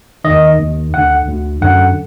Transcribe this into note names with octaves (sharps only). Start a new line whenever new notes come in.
D#3 D#5
D#2
D#2 D#3
D2 D3 F#5
D2 D3
F#2 D3 F#5